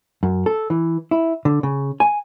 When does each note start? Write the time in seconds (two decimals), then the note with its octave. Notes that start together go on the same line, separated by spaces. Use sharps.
0.23 F#2
0.46 A4
0.70 E3
1.11 E4
1.45 D3
1.63 C#3
2.00 G#5